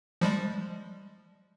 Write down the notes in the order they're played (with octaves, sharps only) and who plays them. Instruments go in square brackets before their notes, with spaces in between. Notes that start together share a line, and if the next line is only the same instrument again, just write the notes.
[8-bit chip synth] F3 G3 G#3